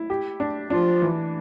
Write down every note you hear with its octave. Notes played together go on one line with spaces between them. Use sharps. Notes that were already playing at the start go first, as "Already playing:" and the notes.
Already playing: E4
G4
D4
F3 D4 F4
E3